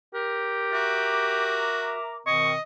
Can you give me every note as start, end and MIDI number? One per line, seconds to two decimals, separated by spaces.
0.14 1.67 67
0.14 2.28 70
0.72 1.95 66
0.72 2.19 76
0.72 2.19 82
0.72 2.19 86
2.27 2.54 47
2.27 2.54 51
2.27 2.54 60
2.27 2.61 75
2.27 2.51 85